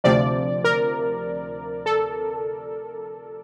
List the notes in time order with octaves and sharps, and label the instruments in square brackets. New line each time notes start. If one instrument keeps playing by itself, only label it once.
[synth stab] D2 C3 F3 D5
A#4
A4